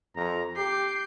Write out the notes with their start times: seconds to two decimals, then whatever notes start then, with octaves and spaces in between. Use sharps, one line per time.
0.16 F2 A#5
0.57 G4 D6 G6 C7